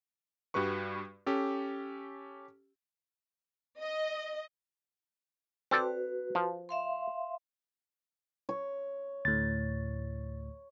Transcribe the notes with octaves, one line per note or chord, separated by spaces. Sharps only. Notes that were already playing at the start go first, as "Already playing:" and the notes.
G2 G3 F#4 B4 C#6
C#4 G4 A4
D#5
C4 F#4 A4 B4 D5
F3
E5 F5 C6
C#5
D2 A2 A6